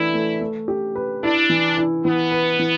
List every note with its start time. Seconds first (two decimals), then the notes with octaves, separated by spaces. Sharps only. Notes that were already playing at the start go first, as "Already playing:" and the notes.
Already playing: E3 A3 D4 E4
0.14 A3
0.41 A3
0.68 G4
0.95 B4
1.23 D4 E4
1.50 E3
1.77 E4
2.05 E3 B3
2.31 B4
2.59 E3